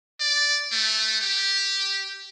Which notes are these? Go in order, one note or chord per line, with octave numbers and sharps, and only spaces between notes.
D5
A3
G4